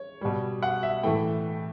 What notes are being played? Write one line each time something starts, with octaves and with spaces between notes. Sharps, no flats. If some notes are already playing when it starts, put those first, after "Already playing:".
Already playing: C#5
B2 G3
F#5
E5
A2 E3 A3 G5